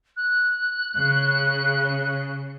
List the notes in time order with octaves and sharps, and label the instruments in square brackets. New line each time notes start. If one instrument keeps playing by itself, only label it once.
[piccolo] F#6
[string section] C#3